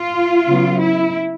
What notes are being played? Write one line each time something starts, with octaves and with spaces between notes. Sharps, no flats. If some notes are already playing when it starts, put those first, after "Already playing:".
Already playing: F4
C#3 F#3 B3
E4